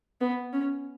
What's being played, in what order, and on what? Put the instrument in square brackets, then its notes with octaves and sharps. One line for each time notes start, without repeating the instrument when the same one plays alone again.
[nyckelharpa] B3
C#4